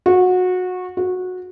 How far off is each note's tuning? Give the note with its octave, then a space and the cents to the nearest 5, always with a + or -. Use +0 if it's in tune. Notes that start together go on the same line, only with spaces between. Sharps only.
F#4 -20
F#4 -15